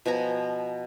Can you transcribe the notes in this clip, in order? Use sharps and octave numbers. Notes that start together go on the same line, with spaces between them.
B2 F3 G#5 A#5